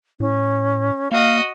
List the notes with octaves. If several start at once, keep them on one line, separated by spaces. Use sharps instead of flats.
A2 C#4
A#3 F#4 D#5 F5